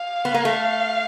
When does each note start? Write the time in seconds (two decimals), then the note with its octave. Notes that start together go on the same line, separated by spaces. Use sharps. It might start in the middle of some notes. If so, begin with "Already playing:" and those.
Already playing: F5
0.25 B3
0.34 A#3
0.45 A3